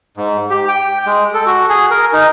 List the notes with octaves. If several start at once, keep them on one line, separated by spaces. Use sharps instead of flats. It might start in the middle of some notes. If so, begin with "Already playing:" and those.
G#2
G4
G5
G#3
A4
F#4
G#4
A#4
D#4